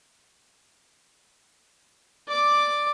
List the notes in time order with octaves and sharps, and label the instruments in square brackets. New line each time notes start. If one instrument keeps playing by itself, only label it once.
[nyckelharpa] D5 D6